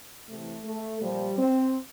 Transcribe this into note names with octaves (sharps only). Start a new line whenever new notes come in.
C3 E3 A3
A3
A#2 F3 G3
C4